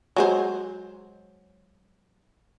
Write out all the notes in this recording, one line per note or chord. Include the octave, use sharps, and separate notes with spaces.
F#3 G#3 C5